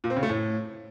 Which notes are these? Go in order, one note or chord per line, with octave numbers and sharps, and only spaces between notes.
A#2
C4
C#3
A3
A2